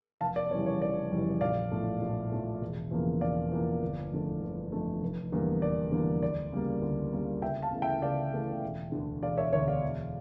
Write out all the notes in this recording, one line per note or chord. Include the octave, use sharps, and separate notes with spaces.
F1 F5 A5
D5
F2 C#3 E3 G3 C#5
C#5
F1 D5
F2 C#3 E3 G3
A#1 D5 F5
A2 F3 A3
A#1
A2 F3 A3
E1
E2 C#3 F3 A#3
E1 D5 F5
E2 C#3 F3 A#3
G1
F2 D3 A3
G1
F2 D3 A3
F1
E2 D3 G3 A#3
F1 D5
E2 D3 G3 A#3
D2 D5
C#3 G3 A#3
D2
C#3 G3 A#3
C#2 E5 G5
F5 A5
C#3 E3 A3
E5 G5
C#2 D5 F5
C#3 E3 A3
E1
D2 D3
E1 D5 F5
C#5 E5
D2 D3 C#5 E5
D5 F5
E1